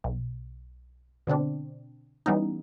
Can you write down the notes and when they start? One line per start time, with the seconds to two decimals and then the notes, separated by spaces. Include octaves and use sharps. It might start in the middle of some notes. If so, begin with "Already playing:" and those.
0.04 B1
1.27 B2 D3 C4 D4
2.26 E3 G3 B3 C#4 D#4